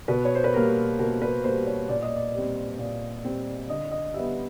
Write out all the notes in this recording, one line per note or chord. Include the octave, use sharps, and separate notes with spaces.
B2 B4
C#5
C5
B4
G3 A#3 A#4
B2 A#4
B4
G3 A#3 C5
C#5
A#2 D5
D#5
D5
G3 C4
A#2
G3 C4
D3 D#5
D#5
G3 B3 E5